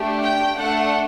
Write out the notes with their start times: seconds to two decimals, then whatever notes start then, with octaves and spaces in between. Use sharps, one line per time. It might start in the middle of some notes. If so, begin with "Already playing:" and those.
Already playing: A3 D4 G4
0.23 G5
0.57 A3 D4 A4 F#5